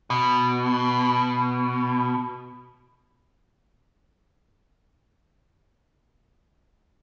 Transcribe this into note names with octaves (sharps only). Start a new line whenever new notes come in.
B2